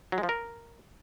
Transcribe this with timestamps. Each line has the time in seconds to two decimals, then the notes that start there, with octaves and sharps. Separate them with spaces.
0.12 F#3
0.18 G#3
0.23 F3
0.29 A#4